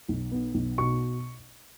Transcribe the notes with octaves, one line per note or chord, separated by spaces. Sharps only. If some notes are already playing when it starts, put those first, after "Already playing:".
B1
B3
B1
B2 C#6